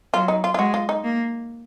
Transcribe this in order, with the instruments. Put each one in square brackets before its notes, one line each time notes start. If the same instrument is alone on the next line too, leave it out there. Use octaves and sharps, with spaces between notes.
[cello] F#3 [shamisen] F4
[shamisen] D#4
F4
F4
[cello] G#3 [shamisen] F#4
[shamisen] F4
D#4
[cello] A#3